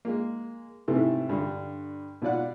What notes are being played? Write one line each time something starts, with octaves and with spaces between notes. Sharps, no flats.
G#3 A#3
G#2 C3 A3 B3 E4
G2 D3
B2 F4 D5 F#5